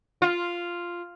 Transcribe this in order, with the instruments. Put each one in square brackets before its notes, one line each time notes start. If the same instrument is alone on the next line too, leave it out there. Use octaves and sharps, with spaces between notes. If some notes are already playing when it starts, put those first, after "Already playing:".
[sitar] F4